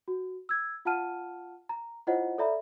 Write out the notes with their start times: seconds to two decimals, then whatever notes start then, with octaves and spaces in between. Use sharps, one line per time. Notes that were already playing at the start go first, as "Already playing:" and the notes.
0.08 F#4
0.49 E6 G#6
0.85 F4 F5 F#5 A5 F6 D#7
1.69 A#5
2.07 E4 F4 C5 C#5 D#5 F#5
2.38 A4 C#5 D5 E5 A#5 B5